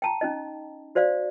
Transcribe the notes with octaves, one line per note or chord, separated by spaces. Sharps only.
G5 A5 A#5
C#4 D#4 D#5
F#4 C5 D5 F5